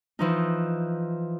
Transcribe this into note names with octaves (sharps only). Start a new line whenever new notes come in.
E3 F3 D#4